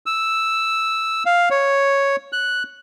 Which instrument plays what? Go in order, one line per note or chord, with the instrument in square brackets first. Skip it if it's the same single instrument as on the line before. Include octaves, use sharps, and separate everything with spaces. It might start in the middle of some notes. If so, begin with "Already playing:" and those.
[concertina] E6
F5
C#5
F#6